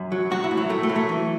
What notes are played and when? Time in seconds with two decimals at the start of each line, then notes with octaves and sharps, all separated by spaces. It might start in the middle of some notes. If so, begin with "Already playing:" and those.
Already playing: F#2
0.12 F#3
0.31 F#3 F#4
0.44 E4
0.51 A2
0.57 F#3
0.69 A2 A3
0.83 A3
0.89 F#3
0.96 A3
1.09 E3